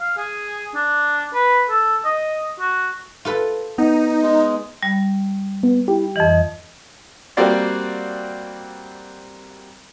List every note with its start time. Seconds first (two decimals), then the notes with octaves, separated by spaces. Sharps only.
0.01 F5
0.17 G#4
0.75 D4
1.34 B4
1.70 A4
2.05 D#5
2.60 F#4
3.25 F4 A4 B4
3.78 B3 D#4
4.22 G#3
4.83 G3
5.63 B3
5.88 E4 G4
6.16 F2 E3 D#5
7.37 G3 A#3 C4 F#4 D5 F5